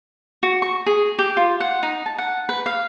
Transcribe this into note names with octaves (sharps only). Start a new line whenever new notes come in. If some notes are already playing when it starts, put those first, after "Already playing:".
F#4
C#6
G#4
G4
F4
F#5
D#4
A5
F#5
B4
F5